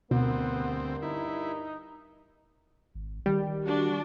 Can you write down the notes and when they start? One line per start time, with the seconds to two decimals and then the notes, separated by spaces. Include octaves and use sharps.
0.11 D2 G2 B2 B3 C4 A#4
1.02 D#4 E4
2.95 G#1
3.26 D#3 G3
3.65 D4 F#4